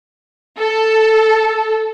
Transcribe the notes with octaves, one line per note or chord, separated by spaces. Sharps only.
A4